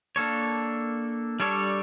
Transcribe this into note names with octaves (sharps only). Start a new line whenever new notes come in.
A#3 D4 A4 C#5
G3 D4 A4 C#5